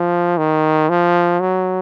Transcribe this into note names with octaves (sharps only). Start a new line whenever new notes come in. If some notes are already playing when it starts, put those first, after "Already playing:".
Already playing: F3
D#3
F3
F#3